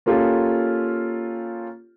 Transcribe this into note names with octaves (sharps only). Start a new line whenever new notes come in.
A#3 C#4 F4 G4 A4